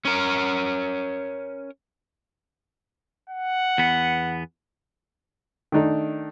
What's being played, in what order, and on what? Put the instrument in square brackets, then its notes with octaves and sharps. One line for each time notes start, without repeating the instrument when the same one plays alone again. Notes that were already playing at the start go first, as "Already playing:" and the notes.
[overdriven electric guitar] C#4 A#4
[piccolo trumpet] F#5
[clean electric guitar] E2 B3
[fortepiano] D#3 A3 D4 D#4